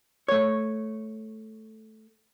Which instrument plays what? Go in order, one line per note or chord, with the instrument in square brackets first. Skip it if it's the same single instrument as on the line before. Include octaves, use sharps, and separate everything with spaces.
[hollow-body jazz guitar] A3 C#5